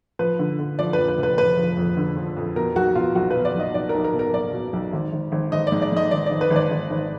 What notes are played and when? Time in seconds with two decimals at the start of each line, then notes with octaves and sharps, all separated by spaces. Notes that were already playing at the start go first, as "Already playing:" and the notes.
0.19 F3 B4
0.39 D3
0.59 D3
0.79 F3 D5
0.93 B4
0.98 F2
1.08 B4
1.18 F1
1.23 B4
1.38 F1 B4
1.58 F3
1.77 F2
1.97 D3
2.17 F3
2.37 F2
2.56 B2 A#4
2.75 B1 F#4
2.95 B2 F4
3.15 B1 F#4
3.30 B2 B4
3.45 D5
3.55 B1 D#5
3.74 B1 D5
3.89 A#4
3.94 B1
4.04 A#4
4.14 B2
4.19 A#4
4.33 B1 D5
4.53 B2
4.73 B1
4.93 G#1
5.13 G#1
5.32 G#1
5.52 G#1 D#5
5.67 D5
5.72 G#2
5.82 D5
5.92 G#2 D#5
6.11 G#1 D5
6.26 G#1 D5
6.41 B4
6.50 G#1
6.56 D5
6.71 G#1
6.90 G#1